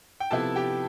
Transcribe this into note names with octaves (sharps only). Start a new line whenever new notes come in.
G5
C3 F3 B3 E4 A4 A5
G4 G5